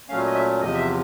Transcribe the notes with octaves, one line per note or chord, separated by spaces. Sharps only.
A#2 F#3 A3 C#4 F5
D#5
E5
E2 C3 F3 D#5
E5